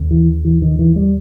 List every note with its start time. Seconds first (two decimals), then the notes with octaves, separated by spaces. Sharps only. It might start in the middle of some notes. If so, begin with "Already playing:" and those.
Already playing: D#2 C#3
0.11 E3
0.45 E3
0.62 D#3
0.79 E3
0.96 G3